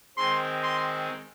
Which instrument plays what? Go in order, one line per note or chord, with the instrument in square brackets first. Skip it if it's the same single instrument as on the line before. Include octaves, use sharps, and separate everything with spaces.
[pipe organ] D#3 G#3 C4 [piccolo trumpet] C6
[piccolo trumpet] C6